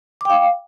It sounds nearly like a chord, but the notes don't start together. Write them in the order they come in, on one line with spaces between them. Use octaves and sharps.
D6 G5 F5